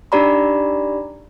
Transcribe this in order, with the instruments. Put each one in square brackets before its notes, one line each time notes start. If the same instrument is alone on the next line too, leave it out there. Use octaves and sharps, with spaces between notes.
[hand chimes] D4 D#4 G4 D5 A#5 B5